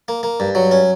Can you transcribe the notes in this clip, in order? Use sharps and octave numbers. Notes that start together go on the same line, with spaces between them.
A#3
A#3
G2
F#3
C#4